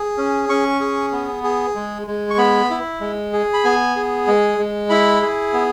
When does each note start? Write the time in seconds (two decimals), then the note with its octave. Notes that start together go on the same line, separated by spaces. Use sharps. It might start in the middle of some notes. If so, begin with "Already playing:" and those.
Already playing: G#4
0.18 C#4
0.49 C#4 C#6
0.80 G#4
1.12 B3
1.44 G#4
1.75 G#3
2.07 G#3
2.30 C#6
2.38 B3 B5
2.70 E4
3.01 G#3
3.33 G#4
3.53 B5
3.64 B3 G#5
3.96 G#4
4.27 G#3
4.58 G#3
4.90 E4 B5
5.22 G#4
5.53 B3